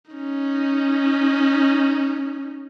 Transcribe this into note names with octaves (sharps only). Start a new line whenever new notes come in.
C#4 D#4